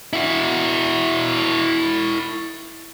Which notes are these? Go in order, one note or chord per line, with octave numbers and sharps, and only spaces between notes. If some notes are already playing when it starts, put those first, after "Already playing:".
E4 F#4